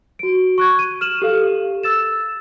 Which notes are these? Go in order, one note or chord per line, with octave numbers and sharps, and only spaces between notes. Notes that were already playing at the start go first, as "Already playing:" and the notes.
F#4 D7
C#6 F#6 G#6
D#7
F6 D#7 E7 F#7
G4 A4 F5
E6 A6 E7